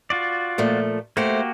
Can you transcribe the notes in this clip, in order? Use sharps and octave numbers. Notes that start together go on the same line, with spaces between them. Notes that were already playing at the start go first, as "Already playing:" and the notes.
F4 F#4 D5
A#2 F3 A3
A3 A#3 F#4 G4 C5